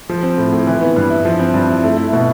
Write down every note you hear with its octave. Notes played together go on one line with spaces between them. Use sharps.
F3
C4
A2
A2
E3
B3
G2
E4
F3
C4
G2
E4
A3
E4
B2